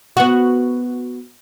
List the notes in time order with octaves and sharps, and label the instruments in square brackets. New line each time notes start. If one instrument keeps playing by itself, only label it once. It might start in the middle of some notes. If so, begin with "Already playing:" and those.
[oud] B3 F#4